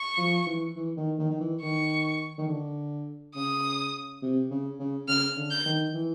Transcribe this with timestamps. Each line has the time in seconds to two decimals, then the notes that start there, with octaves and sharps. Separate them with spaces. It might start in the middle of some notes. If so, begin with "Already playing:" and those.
Already playing: C#6
0.17 F3
0.47 E3
0.76 E3
0.97 D#3
1.19 D#3
1.31 D#3
1.40 E3
1.62 D#3 C#6
2.38 D#3
2.48 D3
3.35 C#3 D#6
4.22 C3
4.50 C#3
4.79 C#3
5.08 C#3 F6
5.37 D3
5.51 G6
5.65 D#3
5.95 E3